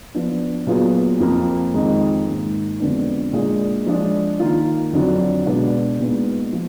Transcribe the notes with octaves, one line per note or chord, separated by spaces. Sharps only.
F3 B3 D4
A#2 F#3 B3 F4 G#4
F2 F3 A#3
F2 D#3 G#3 D#4
G#2 D#3 A#3
F2 D3 G#3 B3 D4
A#2 G#3 D4 G#4
F3 G#3 D4 G#4
D#3 A#3 F4
F2 D3 F#3 D4
B2 G#3 B3 D4 F#4
A#2 G#3 B3 D#4
F3